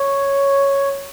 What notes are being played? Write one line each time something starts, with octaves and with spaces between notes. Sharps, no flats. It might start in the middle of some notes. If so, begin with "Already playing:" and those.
Already playing: C#5